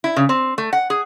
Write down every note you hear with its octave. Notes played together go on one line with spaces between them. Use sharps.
E4
C#3
C4
A3
F#5
G#4